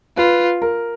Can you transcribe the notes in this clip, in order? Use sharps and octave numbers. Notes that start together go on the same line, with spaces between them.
F4 B4
A#4